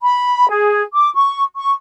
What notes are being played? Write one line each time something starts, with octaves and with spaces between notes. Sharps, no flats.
B5
G#4
D6
C#6
C#6